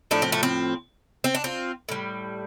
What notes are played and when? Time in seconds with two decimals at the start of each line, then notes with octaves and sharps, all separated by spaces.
0.11 A2 F3 A3 D4
0.22 C4
0.32 A3
0.43 C4
1.24 C4
1.35 D4
1.44 C4 F4
1.89 A2 G3